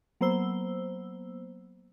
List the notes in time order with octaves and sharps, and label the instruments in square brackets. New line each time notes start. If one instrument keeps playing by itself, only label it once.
[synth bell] F#3 A#3 B3 C5 E6 G7